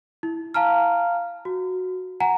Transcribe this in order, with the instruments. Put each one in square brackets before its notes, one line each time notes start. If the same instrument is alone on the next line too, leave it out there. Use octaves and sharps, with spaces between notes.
[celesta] E4
F5 A5 A#5 F6
F#4
F#5 G#5 A#5